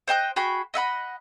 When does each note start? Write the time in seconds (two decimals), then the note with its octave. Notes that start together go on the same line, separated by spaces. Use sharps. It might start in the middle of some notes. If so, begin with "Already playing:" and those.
0.08 C5 D#5 G5 F#6
0.36 F#4 G#4 G5 B5
0.74 D#5 E5 F#5 B5